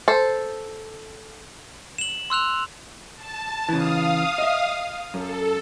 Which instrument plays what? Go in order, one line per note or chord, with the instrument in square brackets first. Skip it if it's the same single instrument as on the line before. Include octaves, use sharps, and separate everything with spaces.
[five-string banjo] A4 C5
[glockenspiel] E7 F#7
C6 E6 F#6 F7
[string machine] A5
[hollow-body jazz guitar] C#3 E3 [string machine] F5 D#6
[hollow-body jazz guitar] D#5 E5
[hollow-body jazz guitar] F#2 [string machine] A4